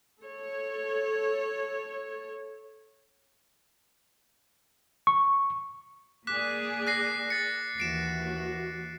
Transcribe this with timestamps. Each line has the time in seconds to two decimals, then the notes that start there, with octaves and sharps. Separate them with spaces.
0.22 A4 C#5
5.07 C#6
6.27 A#3 G#4 D5 D6 F#6 B6
6.87 F#6 A#6 C7
7.30 A6 C#7
7.78 D#2 E3 F#4 C7 D7 E7